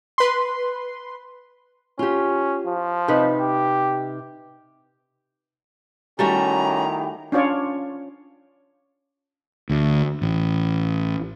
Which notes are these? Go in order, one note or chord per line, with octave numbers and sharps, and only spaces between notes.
B4 C6
C#4 F4 G4
F3
C3 D#4 B4
G4
D#3 G3 A3 C#4 E4 F#4 G4 A#5
C#4 D4 F4 C#5 D5
D2
A1